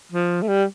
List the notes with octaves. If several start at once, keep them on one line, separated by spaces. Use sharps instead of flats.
F3
A3
G3